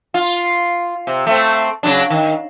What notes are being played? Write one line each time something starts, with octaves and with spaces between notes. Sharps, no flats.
F4
C3
A3 C4
C#3 F#3 D4
D#3